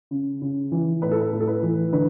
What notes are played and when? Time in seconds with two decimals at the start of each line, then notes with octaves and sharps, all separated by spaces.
0.11 C#3
0.42 C#3
0.72 E3
1.02 A2 B4
1.11 A4
1.21 B4
1.33 A2
1.40 A4
1.47 B4
1.63 E3
1.93 D3 B4